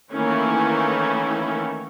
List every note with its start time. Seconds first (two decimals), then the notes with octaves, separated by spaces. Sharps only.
0.12 D#3 E3 A3 A#3 C#4 E4